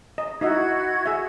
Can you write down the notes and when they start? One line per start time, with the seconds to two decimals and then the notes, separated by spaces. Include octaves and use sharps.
0.18 D#5
0.41 D#4 E4 F#4 D#5 E5 G#6
1.06 G#4 E5